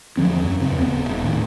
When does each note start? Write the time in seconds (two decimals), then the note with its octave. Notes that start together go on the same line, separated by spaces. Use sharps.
0.17 E2 D3 F3 C4
0.44 F#2
0.59 E2 C#3 C4
0.80 D1 B3
1.05 D#1
1.24 A2 D#3